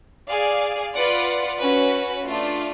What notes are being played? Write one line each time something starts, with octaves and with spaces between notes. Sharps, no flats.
G#4 D5 F5
F4 B4 D5 F#5
C#4 F#4 B4
A3 D4 F4